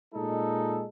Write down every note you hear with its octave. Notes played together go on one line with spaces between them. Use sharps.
A#2 G#3 D#4 A4